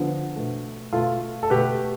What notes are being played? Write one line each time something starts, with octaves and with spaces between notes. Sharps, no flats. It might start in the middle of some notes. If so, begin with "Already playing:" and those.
Already playing: D3 F3 B3
B2 A3
B2 A3 F4 A4
A4
B2 A3 G4 B4